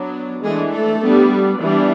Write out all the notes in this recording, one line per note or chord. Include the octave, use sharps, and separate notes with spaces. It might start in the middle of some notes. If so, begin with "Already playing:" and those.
Already playing: F#3 B3 D4
E3 G#3 A3 D4 G#4
A3 A4
G3 B3 D4
E3 G3 B3 D4